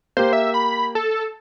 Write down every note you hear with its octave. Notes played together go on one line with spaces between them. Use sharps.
A#3 G4 C5
E5
B5
A4